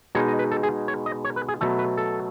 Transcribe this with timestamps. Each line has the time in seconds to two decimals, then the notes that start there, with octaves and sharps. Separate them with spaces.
0.15 B2 G#3 D#4 C#5
0.28 D#5
0.39 B4
0.51 A4
0.63 G#4
0.88 C#5
1.06 D#5
1.25 C#5
1.36 B4
1.48 G#4
1.61 B2 F#3 A3 A4
1.79 B4
1.97 A4